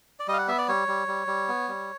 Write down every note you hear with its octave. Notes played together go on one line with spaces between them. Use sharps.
D5
G3 D#5 F5
F#5
B3 E5
D5
G3 C#5
G3
G3
G3
B3
G3